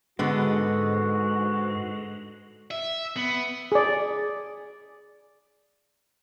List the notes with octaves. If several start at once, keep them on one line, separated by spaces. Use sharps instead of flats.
G#2 D3 G#3 B3 F#4
E5
B3
G#4 D5